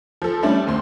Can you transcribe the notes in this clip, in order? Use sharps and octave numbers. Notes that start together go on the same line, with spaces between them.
F3 A4
G3 A3 C#4 D4
D2 C4 C6